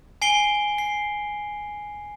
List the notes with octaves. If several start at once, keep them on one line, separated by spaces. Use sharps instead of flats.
G#5 C7 D7 G7
C7